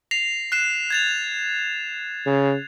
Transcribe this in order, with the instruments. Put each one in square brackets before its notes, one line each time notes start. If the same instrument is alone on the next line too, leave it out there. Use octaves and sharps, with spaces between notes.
[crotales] A#6 C7 F7
F#6 C7 E7
G#6 A6 F7
[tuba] C#3